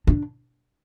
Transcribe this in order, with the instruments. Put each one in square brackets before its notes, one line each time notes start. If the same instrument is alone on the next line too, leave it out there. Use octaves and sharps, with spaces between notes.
[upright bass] D4